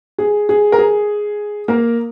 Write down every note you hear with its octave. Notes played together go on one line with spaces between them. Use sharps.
G#4
G#4
A#4
G#4
A#3 A#4